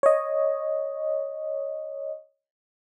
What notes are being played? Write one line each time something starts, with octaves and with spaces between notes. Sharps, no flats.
C#5 D#5